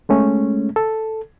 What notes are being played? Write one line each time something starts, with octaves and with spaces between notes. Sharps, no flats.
G#3 A3 C#4
A4